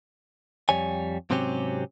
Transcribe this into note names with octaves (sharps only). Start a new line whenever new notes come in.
F2 G3 C#5 G#5
G#2 C3 F#3 C4 C#4 G4